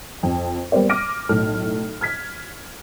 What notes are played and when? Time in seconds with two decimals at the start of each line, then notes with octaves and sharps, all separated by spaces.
0.23 F2
0.72 G3 A#3 B3 C5 D5
0.89 D6 F6 A#6 D7 D#7
1.29 B1 A2 A4 F6
2.01 F6 G#6 B6